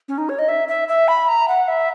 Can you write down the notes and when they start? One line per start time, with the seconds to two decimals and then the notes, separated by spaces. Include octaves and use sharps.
0.08 C#4
0.18 D#4
0.29 C#5
0.39 D#5
0.49 E5
0.68 E5
0.88 E5
1.08 B5
1.29 A#5
1.48 F#5
1.68 E5